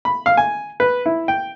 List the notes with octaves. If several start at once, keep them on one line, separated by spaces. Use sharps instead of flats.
B5
F5
G#5
B4
E4
G5